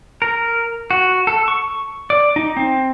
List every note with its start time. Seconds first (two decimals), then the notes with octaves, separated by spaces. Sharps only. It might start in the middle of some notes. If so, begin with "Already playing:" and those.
0.22 A#4
0.91 F#4
1.27 A4
1.48 C#6
2.10 D5
2.36 D#4
2.57 C4